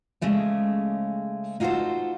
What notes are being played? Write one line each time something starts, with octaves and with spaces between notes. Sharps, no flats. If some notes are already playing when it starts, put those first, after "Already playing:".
C#3 G#3 A3 C#4
D#4 F4 F#4 G#4 A4 C5